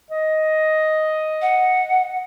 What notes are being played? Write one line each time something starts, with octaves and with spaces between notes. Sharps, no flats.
D#5
F#5